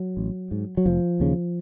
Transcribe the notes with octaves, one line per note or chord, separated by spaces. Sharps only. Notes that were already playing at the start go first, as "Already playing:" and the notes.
Already playing: F#3
A1
G#2
F#3
F1 F3
D#2 C#3